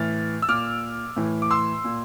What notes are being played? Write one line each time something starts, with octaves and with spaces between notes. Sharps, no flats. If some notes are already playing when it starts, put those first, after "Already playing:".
Already playing: A2 E3 F6 A6
E6
A#2 D6 F6
A2 E3
D6
C6 E6
A#2